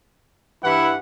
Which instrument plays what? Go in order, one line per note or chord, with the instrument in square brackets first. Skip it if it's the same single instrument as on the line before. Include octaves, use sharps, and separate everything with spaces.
[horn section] G2 E3 F#5 [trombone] E4